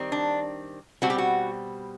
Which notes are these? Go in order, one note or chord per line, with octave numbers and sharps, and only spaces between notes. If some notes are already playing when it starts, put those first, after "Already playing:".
Already playing: D#3 G3 C4
D4
B2 G3 C4 F#4
G4
F#4